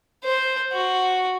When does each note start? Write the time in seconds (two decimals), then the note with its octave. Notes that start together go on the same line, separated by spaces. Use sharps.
0.24 C5
0.72 F#4